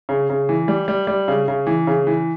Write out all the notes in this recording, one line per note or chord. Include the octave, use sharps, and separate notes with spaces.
C#3
C#3
E3
G3
G3
G3
C#3
C#3
E3
C#3
E3